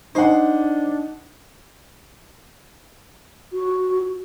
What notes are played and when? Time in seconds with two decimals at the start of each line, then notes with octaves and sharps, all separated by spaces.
0.15 D4 D#4 C5 F#5 C6
3.53 F#4